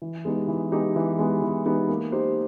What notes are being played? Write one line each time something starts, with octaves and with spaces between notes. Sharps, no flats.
E3
G#3 B3 D#4 G4
E3
G#3 B3 D#4 G4
E3
G#3 B3 D#4 G4
E3
G#3 B3 D#4 G4
A#3
D#4 G4 C5